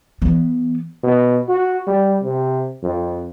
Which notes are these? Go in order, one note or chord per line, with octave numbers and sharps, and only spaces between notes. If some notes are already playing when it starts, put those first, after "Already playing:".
E3 B3
B2
F#4
G3
C3
F2